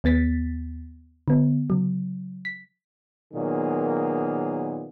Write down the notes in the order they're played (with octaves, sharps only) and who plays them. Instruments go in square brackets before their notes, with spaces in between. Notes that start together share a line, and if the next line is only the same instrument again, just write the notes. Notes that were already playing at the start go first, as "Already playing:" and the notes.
[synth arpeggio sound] D#2 B3 A6 B6
D3 B3
C#3 F#3
B6
[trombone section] A#2 D#3 F#3 A#3 B3 G#4